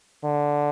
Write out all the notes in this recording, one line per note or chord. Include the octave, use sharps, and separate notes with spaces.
D3